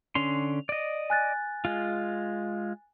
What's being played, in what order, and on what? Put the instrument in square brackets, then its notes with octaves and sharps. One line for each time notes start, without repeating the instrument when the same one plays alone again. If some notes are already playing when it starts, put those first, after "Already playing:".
[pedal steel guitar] D3 C#4 C6 [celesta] F7
[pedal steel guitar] D5 D#5
[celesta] G#5 F#6 A6
[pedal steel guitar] G#3 F4